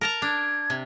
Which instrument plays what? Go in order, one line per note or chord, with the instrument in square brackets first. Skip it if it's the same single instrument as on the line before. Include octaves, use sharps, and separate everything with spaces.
[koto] A#4 A5 A#5
[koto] D4 [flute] G#6
[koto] C3